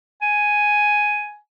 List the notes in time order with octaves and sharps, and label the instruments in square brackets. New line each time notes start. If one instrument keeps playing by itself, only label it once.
[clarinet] G#5